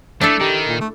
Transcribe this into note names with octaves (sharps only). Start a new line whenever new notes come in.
A3 D4 E4 A4
D#3 G4
A#2
A3